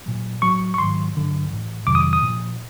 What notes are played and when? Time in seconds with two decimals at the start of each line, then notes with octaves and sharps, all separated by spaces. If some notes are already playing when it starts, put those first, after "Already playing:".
0.06 A#2 F#3
0.42 A2 F#3 C#6
0.74 C#6
0.78 G#2 D#3 F#3 C6
1.15 G2 D3 F#3
1.51 A2 E3
1.87 F2 C3 D#3 F#3 D6
1.95 D#6
2.13 D#6
2.22 A#2 F3